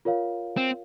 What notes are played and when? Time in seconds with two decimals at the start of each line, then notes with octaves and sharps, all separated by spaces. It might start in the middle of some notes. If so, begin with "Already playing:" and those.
0.05 F4 A#4 C#5 F5
0.57 C4